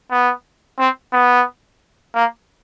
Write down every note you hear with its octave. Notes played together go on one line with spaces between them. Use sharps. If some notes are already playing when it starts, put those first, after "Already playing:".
B3
C4
B3
A#3